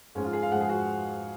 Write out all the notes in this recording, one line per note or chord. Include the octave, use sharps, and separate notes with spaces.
G#2 F3 G#3 C#4
F4
G#4
F5
G#2 F3 G#3 F#5
G#4
F#4